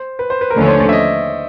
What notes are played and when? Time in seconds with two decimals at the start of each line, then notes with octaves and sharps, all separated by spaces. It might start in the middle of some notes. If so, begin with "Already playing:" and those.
Already playing: C5
0.19 B4
0.30 C5
0.41 B4
0.50 A#4
0.56 D#2 D3 F3 A3 C#4 B4
0.64 C#5
0.68 C5
0.80 D5
0.89 E5
0.93 D#5